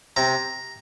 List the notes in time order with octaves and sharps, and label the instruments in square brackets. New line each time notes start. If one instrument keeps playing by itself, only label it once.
[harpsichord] C3 A#5